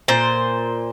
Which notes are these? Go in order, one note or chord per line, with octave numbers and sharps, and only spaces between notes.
A#2 C5